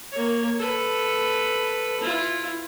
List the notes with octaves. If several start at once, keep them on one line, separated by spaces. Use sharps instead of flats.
A#3 C#5
A4 B4
E4 F4